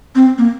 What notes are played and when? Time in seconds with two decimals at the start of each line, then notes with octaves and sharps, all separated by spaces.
0.16 C4
0.38 A#3